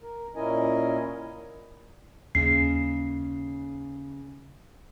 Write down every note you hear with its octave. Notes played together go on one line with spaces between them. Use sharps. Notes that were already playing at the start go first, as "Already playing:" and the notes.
A#4
A#2 C#4 E4 A#4 D#5 G#5
D#2 C#3 C#4 D#4 C7